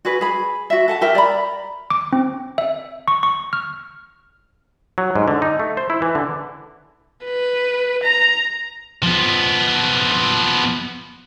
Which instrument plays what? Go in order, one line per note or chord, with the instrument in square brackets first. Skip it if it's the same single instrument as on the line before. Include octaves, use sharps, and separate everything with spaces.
[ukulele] F#4 G#4 B4
G#4 B5
F#4 E5
A4 F#5 A5
G4 A#4 E5
D5 A#5 B5
[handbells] D6
C4
E5
C#6
C#6
F6
[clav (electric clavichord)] F#3
G#2
D3
D#4
A3
C5
E4
E3
D3
[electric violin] B4
A#5
[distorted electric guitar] F3 B3